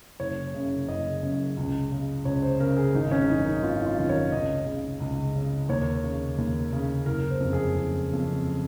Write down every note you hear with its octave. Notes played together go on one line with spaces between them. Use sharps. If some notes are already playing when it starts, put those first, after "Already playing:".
F#1 C#5
F#2 C#3
F#1 D#5
F#2 C#3
C#2
C#3
C#2 C#5
C5
C#3 A#4
G#4
G#1 D#4
C#4
F#2 D#3 D#4
D#4
G#1 F4
F4
F#2 D#3
C#5
C#2 D#5
C#3
C#2
C#3
D#2 C#5
C#3
D#2
C#3
F#1 A#4
C5
F2 C#3
G#4
F#1
F2 C#3